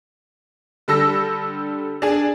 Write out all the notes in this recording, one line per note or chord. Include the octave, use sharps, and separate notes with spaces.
D3 G3 A4 E6 A#6
D4 G#4